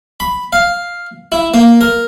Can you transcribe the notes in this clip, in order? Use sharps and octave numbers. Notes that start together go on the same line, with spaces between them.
B5
F5
E4
A#3
A#4